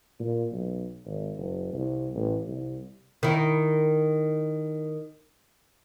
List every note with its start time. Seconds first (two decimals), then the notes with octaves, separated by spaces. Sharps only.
0.20 A#2
0.52 B1
1.06 G#1
1.38 F#1
1.73 C2
2.15 A1
2.48 C2
3.23 D#3 E4